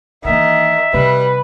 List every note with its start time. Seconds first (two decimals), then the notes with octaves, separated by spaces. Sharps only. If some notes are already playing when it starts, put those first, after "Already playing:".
0.25 D#3 E3 A#3 E5
0.94 C3 G3 C4 B4